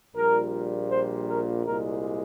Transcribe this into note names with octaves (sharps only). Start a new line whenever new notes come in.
A#1 A#2 G3 A#4
C5
A#4
C2 A#2 G#3 A#4